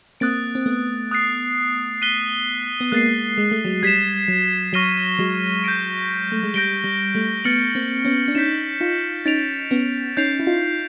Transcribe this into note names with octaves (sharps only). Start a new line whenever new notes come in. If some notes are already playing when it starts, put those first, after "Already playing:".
A#3 C4 D#6 F#6 A6 D7
C4
A3 B3
D#6 F#6 A6 C7
F#6 B6 D#7 G7
B3
G#3 A#3 F#6 A6 C7
G#3
A3
F#3 G#3
G3 G#6 B6 E7
F#3
F#3 C#6 F6 A#6 D#7 G7
F#3 G#3
G6 A#6 D7
A3
G#3
G3 G6 A#6 D7 G7
G3
G3 A3
A3 B3 F6 A6 C#7 F#7
A#3 C4
B3 C#4
D4
C#4 D#4 G6 B6 E7
D#4 F4
C#4 D#4 A6 D7 F7
B3 C#4
C#4 D#4 G6 C7 F7
E4
D#4 F4